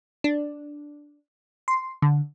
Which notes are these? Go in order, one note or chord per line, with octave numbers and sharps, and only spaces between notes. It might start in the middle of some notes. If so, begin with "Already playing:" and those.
D4
C6
D3